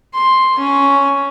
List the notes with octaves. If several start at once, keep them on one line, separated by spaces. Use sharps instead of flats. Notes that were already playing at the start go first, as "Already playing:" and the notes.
C6
C#4